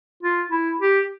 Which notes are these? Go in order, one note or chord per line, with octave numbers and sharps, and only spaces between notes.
F4
E4
G4